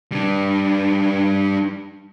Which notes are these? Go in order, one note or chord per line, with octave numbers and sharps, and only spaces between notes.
G3 D4